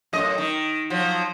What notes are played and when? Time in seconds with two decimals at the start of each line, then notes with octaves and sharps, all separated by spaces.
0.13 F#2 A2 D#5
0.38 D#3
0.90 F3 F#3